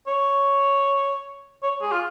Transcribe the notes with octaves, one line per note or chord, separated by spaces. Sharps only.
C#5
C#5
G#4
F4